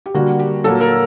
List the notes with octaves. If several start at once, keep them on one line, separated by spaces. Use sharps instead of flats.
G4
D3 G3 A#3 F#4
G4
A#2 F#3 A#3 A4
A#4